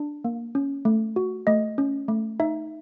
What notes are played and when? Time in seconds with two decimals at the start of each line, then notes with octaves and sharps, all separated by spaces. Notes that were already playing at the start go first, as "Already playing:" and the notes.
Already playing: D4
0.25 A#3
0.55 C#4
0.85 A3
1.16 F#4
1.47 A3 D#5
1.78 C#4
2.08 A3
2.40 D#4 E5